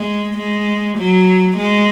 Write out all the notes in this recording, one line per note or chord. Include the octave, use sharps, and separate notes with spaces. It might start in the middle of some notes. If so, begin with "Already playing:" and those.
Already playing: G#3
G#3
F#3
G#3